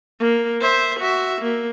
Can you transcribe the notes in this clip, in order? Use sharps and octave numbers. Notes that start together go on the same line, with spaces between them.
A#3
C5 E5
F#4 E5
A#3